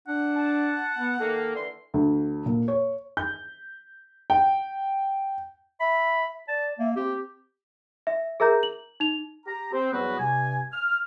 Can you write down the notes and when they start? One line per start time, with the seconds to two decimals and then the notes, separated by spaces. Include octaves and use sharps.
0.08 D4 F#5
0.36 A5
0.98 B3
1.20 D#3 A#3 A4
1.54 D3 E3 C6
1.94 D2
2.46 A#2
2.68 C#5
3.17 G6
4.30 G5
5.80 E5 B5
6.48 D5 A5
6.79 A#3 E5
6.96 C4 G4
8.07 E5
8.40 G#4 A#4 E5 A#5 G6
8.63 F#7
9.00 D#4 F7
9.46 G4 A#5
9.72 C4
9.92 E2 F#3 G3 B3 F#4 B4
10.20 G2 C3 G#5
10.73 F6